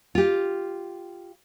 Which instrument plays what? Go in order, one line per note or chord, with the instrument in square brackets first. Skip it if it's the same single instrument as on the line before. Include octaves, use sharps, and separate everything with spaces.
[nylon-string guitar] F4 G4